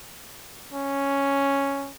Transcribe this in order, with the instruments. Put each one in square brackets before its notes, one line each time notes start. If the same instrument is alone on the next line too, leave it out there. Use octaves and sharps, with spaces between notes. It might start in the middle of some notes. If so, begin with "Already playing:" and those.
[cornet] C#4